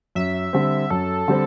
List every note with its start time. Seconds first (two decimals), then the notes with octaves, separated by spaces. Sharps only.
0.15 F#2 E5
0.53 D3 G3 C4
0.90 F#2 A4
1.28 D3 G3 C4